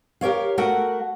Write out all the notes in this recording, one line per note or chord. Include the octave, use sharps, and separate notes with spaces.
G4 A#4 C#5 F5
A3 F#4 A#4 F#5